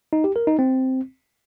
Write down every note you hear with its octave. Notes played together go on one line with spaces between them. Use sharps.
D#4
G4
A#4
D#4
C4